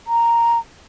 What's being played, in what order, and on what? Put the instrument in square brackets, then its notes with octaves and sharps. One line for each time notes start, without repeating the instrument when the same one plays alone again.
[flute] A#5